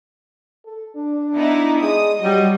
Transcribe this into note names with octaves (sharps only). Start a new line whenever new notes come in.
A4
D4
B3 D#4 E4
G#3 D#6
F#3 G3 D#5